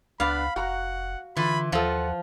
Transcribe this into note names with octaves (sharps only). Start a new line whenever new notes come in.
C#2 B3 D4 F5 B5
F1 F#4 F#5 A#5
D3 E3 F4 B5
D#2 F3 F4 A4 F#5